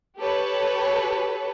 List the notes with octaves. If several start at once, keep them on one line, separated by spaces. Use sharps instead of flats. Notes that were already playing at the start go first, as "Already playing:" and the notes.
G4 A4 B4 C#5